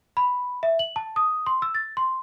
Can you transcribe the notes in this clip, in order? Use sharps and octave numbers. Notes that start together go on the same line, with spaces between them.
B5
E5
F#7
A5
D#6
C6
E6
A6
C6